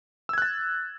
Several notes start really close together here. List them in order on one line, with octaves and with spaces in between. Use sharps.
E6 G#6 F#6 A6